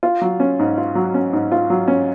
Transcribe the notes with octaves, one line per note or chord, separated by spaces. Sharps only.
F4
F#3
C#4
G#2
F4
F#3
C#4
G#2
F4
F#3
C#4